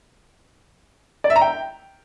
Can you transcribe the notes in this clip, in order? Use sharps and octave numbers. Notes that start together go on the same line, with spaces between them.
D5
E5
A#5
G5